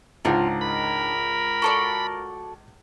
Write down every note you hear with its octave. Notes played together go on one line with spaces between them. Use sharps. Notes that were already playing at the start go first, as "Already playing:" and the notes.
C#2 G#2 D4 D#4 F4
A#4 B5
F#4 A4 D5